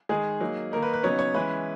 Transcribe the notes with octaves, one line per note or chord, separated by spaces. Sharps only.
D#3 G#3 D#4 G#4
F#3 A#3 D#4
D#3 A#3 D#4 A#4
B4
B4
C#3 F#3 B3 D#4 C#5
C#5
E3 G#3 C#4 E4 B4